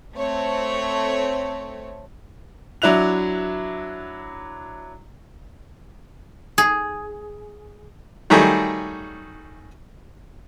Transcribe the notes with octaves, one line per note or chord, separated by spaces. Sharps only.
A3 C4 C#5
F#3 D4 E4 F#6 F7
G#4
D#3 F#3 G3 A3 G#4 C#6